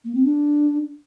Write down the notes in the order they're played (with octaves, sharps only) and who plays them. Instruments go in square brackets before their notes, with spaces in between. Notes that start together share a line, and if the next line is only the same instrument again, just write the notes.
[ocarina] A#3
C4
D4